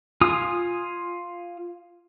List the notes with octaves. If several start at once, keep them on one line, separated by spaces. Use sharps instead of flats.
F4 G#5 D#6